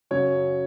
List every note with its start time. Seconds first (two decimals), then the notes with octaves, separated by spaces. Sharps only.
0.11 F#2 C#3 F#3 C#5